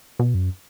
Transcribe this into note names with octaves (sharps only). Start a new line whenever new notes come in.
B2
F#2